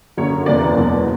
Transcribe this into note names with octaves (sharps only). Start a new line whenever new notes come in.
F#2 D3 A#3 C#5
F#1 E2 C#3 E3 A#3 D5
F#1 E2 B2 F#3